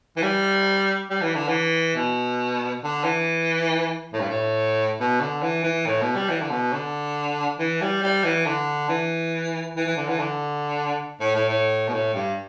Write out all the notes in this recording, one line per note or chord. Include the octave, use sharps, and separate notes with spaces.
E3
G3
G3
E3
D3
E3
B2
D3
E3
A2
G2
A2
B2
D3
E3
E3
A2
B2
G3
E3
D3
B2
D3
E3
G3
G3
E3
D3
E3
E3
E3
D3
E3
D3
A2
A2
A2
B2
A2
G2